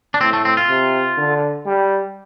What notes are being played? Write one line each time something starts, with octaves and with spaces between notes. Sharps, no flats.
D4
A2 C4
A3
C4
F4
C3
D3
G3